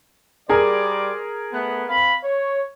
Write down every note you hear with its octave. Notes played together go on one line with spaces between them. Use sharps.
G3 G#4 A#4 C5 D5 G#5
A3 B3
C4 F5 B5
C#5